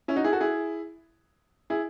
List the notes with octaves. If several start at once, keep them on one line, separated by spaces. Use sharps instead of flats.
C#4 E4
D#4 F#4
E4 G#4
F#4 A4
E4 G#4
E4 G#4